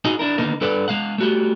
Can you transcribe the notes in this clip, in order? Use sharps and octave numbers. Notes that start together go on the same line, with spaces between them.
D#4 F#4 G#4 D#5
D4 E4 A#4
D3 D#3 A#3 B3 D#4
G2 A4 B4 D5 F#5
G#3 F5 F#5
A3 F#4 G4